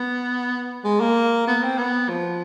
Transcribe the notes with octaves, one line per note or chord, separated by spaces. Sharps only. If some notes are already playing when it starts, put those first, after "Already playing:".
Already playing: B3
G#3
A#3
B3
C4
B3
F3